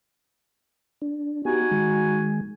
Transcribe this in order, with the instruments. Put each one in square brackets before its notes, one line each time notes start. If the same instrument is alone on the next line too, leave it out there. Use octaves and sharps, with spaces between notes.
[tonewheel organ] D4
[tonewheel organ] B3 G4 [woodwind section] D#4 F#4 G#5
[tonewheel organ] D#3 G#3